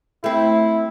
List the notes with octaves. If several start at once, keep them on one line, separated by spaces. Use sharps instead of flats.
A3 C4 E4